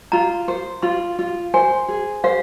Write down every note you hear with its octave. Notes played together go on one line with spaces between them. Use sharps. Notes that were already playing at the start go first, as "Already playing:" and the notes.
F4 A#5
C5
F4 C6
F4
C5 G#5
G#4
C5 F5